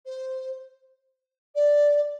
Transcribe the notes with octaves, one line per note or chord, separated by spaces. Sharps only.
C5
D5